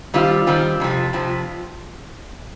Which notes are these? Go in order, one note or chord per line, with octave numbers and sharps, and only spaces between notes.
D#3 G3 C4 F4
D#3 G3 C4 F4
F2 C3 F3
F2 C3 F3